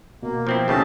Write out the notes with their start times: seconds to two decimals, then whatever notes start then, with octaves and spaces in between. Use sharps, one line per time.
0.23 B2 A#3
0.47 F3 C4 E4
0.68 D#2 C#3 A3 C#4 G4 A5